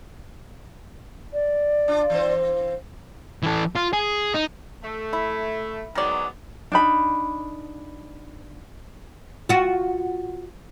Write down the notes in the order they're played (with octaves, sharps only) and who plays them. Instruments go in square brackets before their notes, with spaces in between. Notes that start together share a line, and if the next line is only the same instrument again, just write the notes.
[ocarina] D5
[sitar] D4 F4
E3 C4 C5
[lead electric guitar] E3 A4
F4
G#4
D#4
[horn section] A3
[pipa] E4
[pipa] D#3 D5 [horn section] F#3 G#3 B3
[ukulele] D4 D#4 B5
[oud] F4 F#4